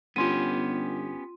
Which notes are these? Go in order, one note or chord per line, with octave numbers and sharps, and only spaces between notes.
G1 B3 C#4 F4 G4 C6 D#7